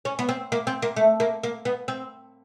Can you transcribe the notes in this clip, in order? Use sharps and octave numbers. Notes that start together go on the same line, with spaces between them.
C#4
B3
C4
A#3
C4
A#3
A3
A#3
A#3
B3
C4